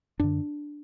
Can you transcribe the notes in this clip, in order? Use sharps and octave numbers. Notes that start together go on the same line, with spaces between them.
F#2 D3 D4